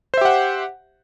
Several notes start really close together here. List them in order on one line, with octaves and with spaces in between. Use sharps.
C5 E5 G4 F#5